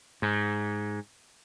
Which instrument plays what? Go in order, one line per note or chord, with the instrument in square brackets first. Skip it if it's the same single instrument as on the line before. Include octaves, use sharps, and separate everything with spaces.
[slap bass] G#2